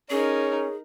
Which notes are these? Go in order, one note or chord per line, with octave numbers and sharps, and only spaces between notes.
C#4 D#4 G#4 A#4 C#5